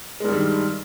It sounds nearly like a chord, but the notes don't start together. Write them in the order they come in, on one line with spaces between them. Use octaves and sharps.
G#3 G2 G3 D#3